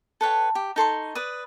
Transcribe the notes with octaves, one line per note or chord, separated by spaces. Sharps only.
A4 B4 C#5 G5
G4
D#4 A4 C6 C#6
B4 D5 D#6